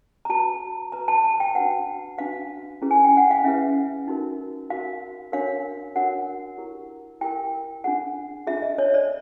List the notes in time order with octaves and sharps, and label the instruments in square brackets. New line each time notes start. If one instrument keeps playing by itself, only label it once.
[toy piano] A#5
F#4 B4 A5
F#4 B4 A#5
A5
A5
G5
D4 F#4 B4 F#5
D4 F#4 B4 F5
C#4 E4 G#4 B4
G#5
G5
F#5
F5
C#4 E4 G#4 B4 E5
D#4 F#4 A#4
D#4 F#4 A#4 F5
D4 F#4 A#4 C#5 F5
D4 F#4 A#4 C#5 F#5
E4 G4 A#4
E4 G4 A#4 G5
D4 F4 G#4 F#5
D4 F4 G#4 E5
D#5
C#5
D5